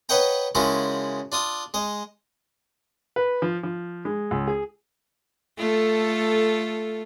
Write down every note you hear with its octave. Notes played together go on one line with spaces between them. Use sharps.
B4 C#5 D#5 F#5 G5 A#5
C#3 F3 G#3 E4 F#4 A#4
D4 F4 D#6
G#3 D#5
B4
F3
F3
G#3
C#2
G#4
A3 F4 A4